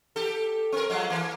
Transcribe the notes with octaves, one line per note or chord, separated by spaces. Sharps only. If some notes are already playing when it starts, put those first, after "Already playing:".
G4 A4
C4 A#4
F3 F#3 G#3
E3 A#3